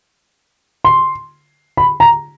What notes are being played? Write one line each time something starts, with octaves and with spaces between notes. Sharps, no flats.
C6
B5
A#5